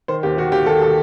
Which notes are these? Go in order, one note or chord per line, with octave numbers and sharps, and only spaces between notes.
D#3 C5
D#2 G4
D#3 F#4
D#2 G4
D#3 A4
A4